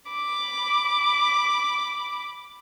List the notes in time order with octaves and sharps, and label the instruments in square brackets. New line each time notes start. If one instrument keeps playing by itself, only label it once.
[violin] B5 D6